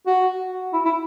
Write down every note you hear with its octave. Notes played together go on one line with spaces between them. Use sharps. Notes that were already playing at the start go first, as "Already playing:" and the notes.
F#4
E4
E4